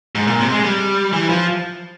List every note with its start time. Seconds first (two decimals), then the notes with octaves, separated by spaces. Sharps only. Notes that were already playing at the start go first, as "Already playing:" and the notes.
0.15 G#2
0.27 A#2
0.40 C3
0.52 G#3
0.64 G3
1.13 E3
1.29 F3